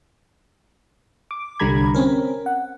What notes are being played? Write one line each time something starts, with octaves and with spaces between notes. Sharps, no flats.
D6
C2 D3 G3 A#5 B5 G#6
C4 C#4 A#4
F#5